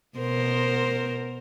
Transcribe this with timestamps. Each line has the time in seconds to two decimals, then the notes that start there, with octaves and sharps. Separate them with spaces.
0.18 B2 A#4 C5